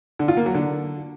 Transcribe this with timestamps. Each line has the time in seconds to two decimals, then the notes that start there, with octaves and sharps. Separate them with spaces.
0.19 D3
0.28 F4
0.37 A#3
0.46 F#3
0.54 D3